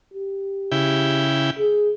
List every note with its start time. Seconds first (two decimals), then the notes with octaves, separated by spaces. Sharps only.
0.14 G4
0.71 C#3 E4 G5
1.59 G#4